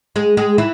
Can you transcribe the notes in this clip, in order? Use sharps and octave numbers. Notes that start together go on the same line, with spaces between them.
G#3 G#4
G#3 G#4
E3 E4